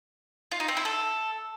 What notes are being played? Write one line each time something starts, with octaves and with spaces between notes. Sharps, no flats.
F4
D#4
C4
E4
A4